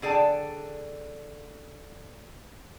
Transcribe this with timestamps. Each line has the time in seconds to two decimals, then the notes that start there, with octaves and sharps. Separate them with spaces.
0.02 D3 G#4 D5 G5 A5